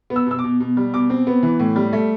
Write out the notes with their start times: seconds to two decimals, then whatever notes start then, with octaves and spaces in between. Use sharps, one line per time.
0.10 B3
0.16 E6
0.26 B2 E6
0.39 D6
0.44 B2
0.60 B2
0.77 G3
0.94 B2 D6
1.10 C4
1.27 B3
1.43 E3
1.59 A2
1.76 G3
1.93 A3